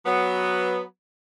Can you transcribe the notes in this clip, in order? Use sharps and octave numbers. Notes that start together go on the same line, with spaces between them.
F#3 B3